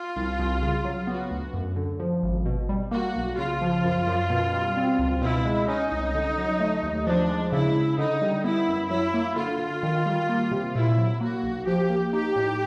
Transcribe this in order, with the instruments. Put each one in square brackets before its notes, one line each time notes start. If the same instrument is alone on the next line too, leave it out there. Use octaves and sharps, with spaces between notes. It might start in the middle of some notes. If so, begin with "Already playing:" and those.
Already playing: [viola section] F4
[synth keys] C2
C2
C#3
F#3
[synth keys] B3 [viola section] F#4
[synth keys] D2
F#2
D3
F3
G#1
B2
G3
[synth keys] A#3 [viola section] F#4
[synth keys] B1
[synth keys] C#3 [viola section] F4
[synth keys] F3
F#2
F#2
B2
G3
C4
C#2
[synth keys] B2 [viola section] E4
[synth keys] G#3
[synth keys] C#4 [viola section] D#4
[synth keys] C2
D3
F#3
A3
D#2
[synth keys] F3 [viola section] D4
[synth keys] G#3
[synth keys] C#3 [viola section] E4
[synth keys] C#3
[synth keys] D3 [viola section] D#4
[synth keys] G3
[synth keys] B3 [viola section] E4
[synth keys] F#2
[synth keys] F#3 [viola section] E4
[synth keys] A#3
[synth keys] D3 [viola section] F4
[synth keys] D3
D#3
G3
A#3
C3
[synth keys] A#2 [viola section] E4
[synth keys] F#3
[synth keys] A#3 [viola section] F#4
[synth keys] B1
[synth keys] F3 [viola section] G4
[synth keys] A#3
[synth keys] D#4 [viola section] G4
[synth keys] A2